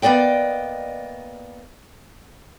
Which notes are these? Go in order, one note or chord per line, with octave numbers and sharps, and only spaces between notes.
A#3 B3 D5 D#5 G5